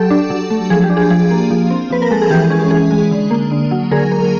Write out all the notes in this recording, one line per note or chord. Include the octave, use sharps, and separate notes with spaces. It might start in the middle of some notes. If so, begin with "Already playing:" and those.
Already playing: F#3 G4 A4
D4
F#3
A3
F3 G#4
G4
D4
G#4
F3 G#4
A#3
F3
C4
F3 B4
A#4
G#3 A4
G#4
E3 G4
C#4 G#4
E3 G#4
G#3
D3
A#3
D3
F#3
D3 G#4 A#4
A#3